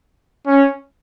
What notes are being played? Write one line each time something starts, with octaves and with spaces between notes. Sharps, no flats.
C#4